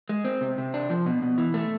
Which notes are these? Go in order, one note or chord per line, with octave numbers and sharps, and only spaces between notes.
G#3
C4
C3
C3
D4
F3
B2
B2
E3
A3